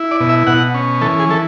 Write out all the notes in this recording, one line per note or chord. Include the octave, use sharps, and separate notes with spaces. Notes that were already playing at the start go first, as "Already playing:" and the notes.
Already playing: E4
D5
B2
E5
B2 F#5
C#4
E3 A4
G#4
E3 A4